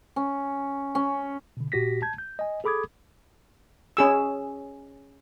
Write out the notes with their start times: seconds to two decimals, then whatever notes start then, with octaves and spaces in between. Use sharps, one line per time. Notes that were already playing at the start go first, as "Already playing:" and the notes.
0.16 C#4
0.95 C#4
1.57 B2 D3
1.72 A#2 F#4 G4 A#6 B6
2.02 A5 G6 G#6
2.18 G6
2.39 D#5 G#5
2.64 G#4 A4 B5 D6 D#6 G#6
3.97 C#4 G#4 E6